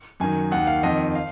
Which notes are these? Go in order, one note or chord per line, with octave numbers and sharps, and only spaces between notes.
F#2 D#3 G#5
D#2 D#3 F#5
F5
F2 D#3 D#5
F5